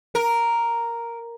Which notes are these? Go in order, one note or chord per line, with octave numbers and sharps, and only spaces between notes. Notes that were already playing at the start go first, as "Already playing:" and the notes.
A#4